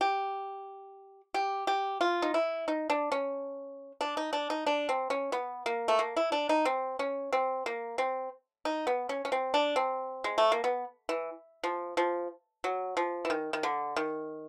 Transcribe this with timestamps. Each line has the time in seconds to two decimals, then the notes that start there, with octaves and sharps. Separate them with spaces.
0.01 G4
1.34 G4
1.67 G4
2.01 F4
2.22 D#4
2.34 E4
2.68 D#4
2.90 D4
3.12 C#4
4.01 D4
4.17 D#4
4.33 D4
4.50 D#4
4.66 D4
4.89 C4
5.10 C#4
5.32 B3
5.66 A#3
5.88 A3
5.99 A#3
6.17 E4
6.32 D4
6.49 D#4
6.65 C4
6.99 C#4
7.33 C4
7.66 A#3
7.98 C4
8.65 D#4
8.87 B3
9.09 C#4
9.25 C#4
9.32 C4
9.54 D4
9.76 C4
10.24 G#3
10.38 A3
10.52 A#3
10.64 B3
11.09 E3
11.63 F3
11.97 F3
12.64 F#3
12.97 F3
13.25 E3
13.30 D#3
13.53 D#3
13.63 D3
13.96 D#3